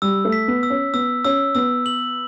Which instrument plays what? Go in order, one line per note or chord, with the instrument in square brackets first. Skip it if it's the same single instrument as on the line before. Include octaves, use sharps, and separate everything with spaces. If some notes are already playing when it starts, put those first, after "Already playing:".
[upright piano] G3 [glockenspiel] E6
[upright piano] A3
[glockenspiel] B6
[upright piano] B3
[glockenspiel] E6
[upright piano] C#4
[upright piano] B3 [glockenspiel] E6
[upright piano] C#4 [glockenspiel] E6
[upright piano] B3 [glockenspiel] E6
[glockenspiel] F#7